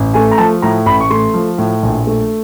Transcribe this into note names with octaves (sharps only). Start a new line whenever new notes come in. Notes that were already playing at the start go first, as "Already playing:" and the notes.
Already playing: A1
A3 G#5
A#5
F3 A5
A2 A#5
A1 B5
C#6
A3 C6
F3
A2
A#1
A3